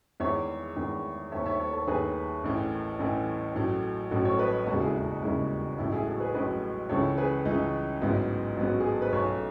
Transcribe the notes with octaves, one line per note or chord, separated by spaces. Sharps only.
E2 D#3 G#3 C#5 E5
E2 D#3 G#3
D#2 D#3 A3 C#5 E5
C#5 E5
A4 C#5
A4 C#5
D#2 D#3 A3 G#4 B4
A1 A2 E3
A1 A2 E3
A1 A2 F#3
A1 A2 F#3 F#4 A4
A4 C#5
B4 D#5
E1 D#2 C#3 G#3 F#4 A4
E4 G#4
E4
D#4
E1 D#2 C#3 G#3 E4
A1 A2 F#3 E4
E4 G#4
F#4 A4
G#4 B4
A1 A2 F#3 B4 D#5
C#2 C#3 E3 A4 C#5
G#4 B4
C#2 C#3 E3 D#4
A1 G#2 F#3 B3 E4
A1 G#2 F#3 B3
F#4
G#4
A4
B4
B1 B2 A3 A4 C#5